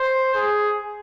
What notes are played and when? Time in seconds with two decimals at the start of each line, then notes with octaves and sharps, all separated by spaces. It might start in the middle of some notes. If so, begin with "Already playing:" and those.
Already playing: C5
0.35 G#4